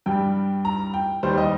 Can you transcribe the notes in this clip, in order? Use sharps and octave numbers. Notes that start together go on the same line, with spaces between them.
G2 G3 G5
A#5
G5
D#2 D#3 G3 C5
D#5